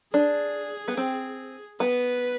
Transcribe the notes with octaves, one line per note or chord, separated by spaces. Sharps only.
D4 G#4
B3
C4
B3 B4